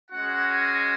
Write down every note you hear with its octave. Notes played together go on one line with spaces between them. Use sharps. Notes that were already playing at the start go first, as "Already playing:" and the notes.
G#3 C#4 F#4 F#5
G#5